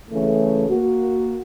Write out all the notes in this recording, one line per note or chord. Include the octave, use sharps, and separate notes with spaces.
C#3 E3 A3
A#3 F#4